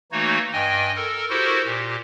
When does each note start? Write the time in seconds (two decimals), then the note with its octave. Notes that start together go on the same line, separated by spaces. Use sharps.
0.12 E3 A3 A#3 D#4 F#4 C#5
0.53 G2 D#5 G5 G#5
0.95 A4 A#4
1.30 E4 F#4 G4 A4 A#4 C5
1.64 A#2 G4